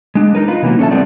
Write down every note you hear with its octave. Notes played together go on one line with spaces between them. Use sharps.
G#3 D4
D#4 A#4 B4
D#4 F4 B4
C3 E3 F#3 G3 A#3 B3
C#4 D4 A4 E5 A5
G3 A3 B3 C4 D5